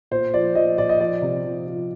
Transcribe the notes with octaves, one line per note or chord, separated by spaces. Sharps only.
A#2 C5
F3 D5
F3 D#5
A#2 D5
D#5
F3 D5
C3
F3
F3